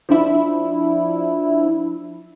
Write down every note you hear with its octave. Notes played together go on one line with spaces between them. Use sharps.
F3 D4 E4